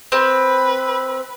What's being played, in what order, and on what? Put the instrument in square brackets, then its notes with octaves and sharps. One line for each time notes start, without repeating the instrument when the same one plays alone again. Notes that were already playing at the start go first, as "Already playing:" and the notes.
[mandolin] C4 [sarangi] B4